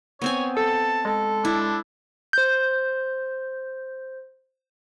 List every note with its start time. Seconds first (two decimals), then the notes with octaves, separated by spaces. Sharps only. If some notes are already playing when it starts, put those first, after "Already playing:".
0.22 B3 C4 C#5 G#5
0.57 A4 A5
1.05 G#3 A4
1.45 D4 E4
2.33 C5 G6